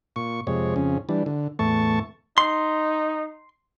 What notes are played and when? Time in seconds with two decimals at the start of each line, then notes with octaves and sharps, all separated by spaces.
0.16 A#2 C#6
0.47 F2 C3 G#3 C#5
0.76 F2 C#3 C#4
1.09 E3 G3 D4
1.26 D3
1.59 E2 A2 A3 A5 C#6
2.38 D#4 C6